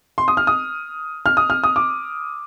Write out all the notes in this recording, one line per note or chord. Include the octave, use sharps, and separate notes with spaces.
C6
D#6
F6
D#6
F6
D#6
F6
D#6
D6